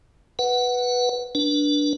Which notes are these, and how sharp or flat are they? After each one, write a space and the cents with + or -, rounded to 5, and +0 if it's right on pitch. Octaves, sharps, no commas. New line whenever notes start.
B4 -5 F#5 +0
D4 -5 B4 -30